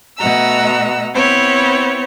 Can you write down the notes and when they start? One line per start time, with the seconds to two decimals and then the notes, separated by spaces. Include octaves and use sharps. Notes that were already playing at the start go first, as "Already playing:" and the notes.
0.18 B2 A3 D#5 F#5 A#5 E6
1.14 B3 C4 E4 C#5